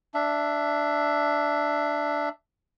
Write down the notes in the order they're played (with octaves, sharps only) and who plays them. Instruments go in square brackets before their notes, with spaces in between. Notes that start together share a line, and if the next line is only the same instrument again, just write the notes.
[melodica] D4 E5